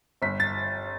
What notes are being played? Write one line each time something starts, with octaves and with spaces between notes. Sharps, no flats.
G1 B6
A6